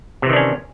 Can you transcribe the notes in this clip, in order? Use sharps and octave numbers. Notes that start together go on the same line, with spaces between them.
C3 D#3 E3 C#4 D4